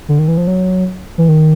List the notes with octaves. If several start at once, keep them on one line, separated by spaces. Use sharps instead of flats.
D3
D#3
E3
F3
F#3
E3
D#3